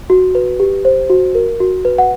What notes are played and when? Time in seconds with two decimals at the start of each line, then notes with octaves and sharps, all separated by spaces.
0.10 F#4
0.35 B4
0.60 G4
0.85 C5
1.10 F#4
1.35 A#4
1.60 F#4
1.85 B4
1.98 F#5